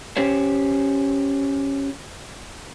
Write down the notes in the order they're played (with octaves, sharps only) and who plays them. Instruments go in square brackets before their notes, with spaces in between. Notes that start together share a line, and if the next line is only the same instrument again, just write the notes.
[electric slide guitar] C#4 G4 C5 C#5